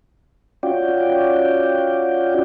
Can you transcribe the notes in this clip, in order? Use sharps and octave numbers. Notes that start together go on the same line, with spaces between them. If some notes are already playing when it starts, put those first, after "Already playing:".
C#4 F4 F#4 D5 G5